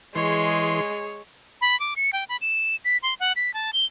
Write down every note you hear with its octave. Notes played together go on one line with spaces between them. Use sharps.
E3 G#3 G#4 C#5 C6
B5
D6
C#7
G5
B5
E7
B6
C6
F#5
B6
A5
G7